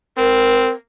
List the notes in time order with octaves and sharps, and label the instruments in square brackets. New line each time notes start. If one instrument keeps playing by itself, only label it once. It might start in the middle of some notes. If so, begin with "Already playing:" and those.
[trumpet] C4 [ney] A#4